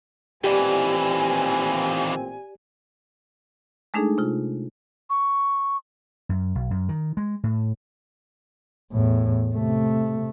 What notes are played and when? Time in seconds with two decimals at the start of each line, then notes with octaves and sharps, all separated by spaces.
0.44 A1 D#2 A#2 E3 C4 G4 D5 G#5
3.94 G#3 A3 D4 D#4 G#4 A4
4.18 C3 F4
5.10 C#6
6.29 F#2
6.55 B1
6.71 F#2
6.89 D#3
7.17 G#3
7.44 A2
8.92 E2 A2
9.54 C3 A3